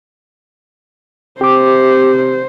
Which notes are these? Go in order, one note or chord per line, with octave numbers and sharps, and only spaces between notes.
C3 G4 C5 D6